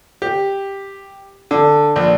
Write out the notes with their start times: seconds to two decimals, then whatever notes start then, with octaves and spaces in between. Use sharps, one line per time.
0.22 G4
1.51 D3
1.96 A#1